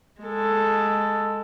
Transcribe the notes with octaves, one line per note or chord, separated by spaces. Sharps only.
G#3 A4